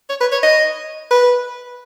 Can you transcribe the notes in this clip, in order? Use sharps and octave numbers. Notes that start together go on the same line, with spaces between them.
C#5
B4
C#5
D#5
B4